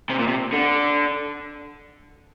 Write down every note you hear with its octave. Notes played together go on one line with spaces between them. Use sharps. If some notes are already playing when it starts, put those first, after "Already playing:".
C3
A#2
C3
D3